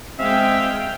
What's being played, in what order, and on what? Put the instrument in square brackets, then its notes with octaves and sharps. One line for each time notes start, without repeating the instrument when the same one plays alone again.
[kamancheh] G#3 G#5 [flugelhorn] C4 [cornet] E5 [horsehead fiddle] F5 G5